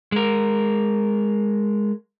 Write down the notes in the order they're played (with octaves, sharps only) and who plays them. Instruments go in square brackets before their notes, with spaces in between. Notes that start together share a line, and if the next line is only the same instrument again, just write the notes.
[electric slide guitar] G#3 A#4